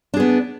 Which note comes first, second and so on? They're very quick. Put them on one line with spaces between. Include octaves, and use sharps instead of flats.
D4 G#4 B3